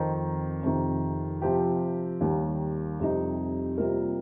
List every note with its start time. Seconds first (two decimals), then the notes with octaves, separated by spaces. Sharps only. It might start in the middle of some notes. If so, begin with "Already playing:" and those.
Already playing: F2 D#3 C4 D#4
0.63 F2 C3 D#3
1.42 C3 F3 C4 G4
2.21 D#2 D#3 G3
2.99 F2 C3 G3 D#4
3.78 C3 G3 A#3 F4 A#4